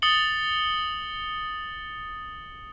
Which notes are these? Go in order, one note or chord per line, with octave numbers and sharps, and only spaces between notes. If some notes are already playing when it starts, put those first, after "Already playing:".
D#6 A6 C#7 F#7 G7